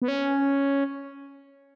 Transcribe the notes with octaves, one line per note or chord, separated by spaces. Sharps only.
B3
C#4